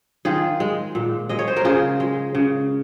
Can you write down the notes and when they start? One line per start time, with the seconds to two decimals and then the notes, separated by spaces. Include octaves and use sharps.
0.25 D#3 F4 G#4
0.60 G#3
0.95 A#2
1.29 G#3 D#5
1.39 C#5
1.48 C5
1.56 A#4
1.65 C#3 F4 G#4
2.00 G#3
2.35 C#3